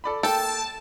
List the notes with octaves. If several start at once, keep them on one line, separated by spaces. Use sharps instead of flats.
A4 D5 B5
A#3 A4 G5 A5